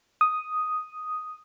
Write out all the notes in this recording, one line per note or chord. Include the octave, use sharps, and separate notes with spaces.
D#6